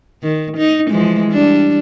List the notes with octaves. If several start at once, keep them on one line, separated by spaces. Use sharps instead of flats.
D#3
D#4
E3 F3 G#3
G3 D4